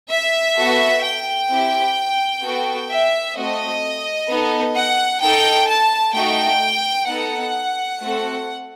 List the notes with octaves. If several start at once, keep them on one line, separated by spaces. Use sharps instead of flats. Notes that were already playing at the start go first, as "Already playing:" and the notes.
E5
B3 F#4 A4
G5
C4 E4 G4
B3 F#4 A4
E5
A3 C4 F#4 A4 D#5
B3 D#4 A4
F#5
D#4 A4 G5
A5
A3 D#4 F#4 G5
B3 D#4 A4 F#5
A3 C4 F#4 A4